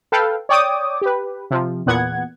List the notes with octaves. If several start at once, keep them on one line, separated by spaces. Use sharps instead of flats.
A4 B4 F5 G5
C#5 D5 G5 D6 D#6
G4 B4
C3 F3
E2 A#2 B3 F#5 G#6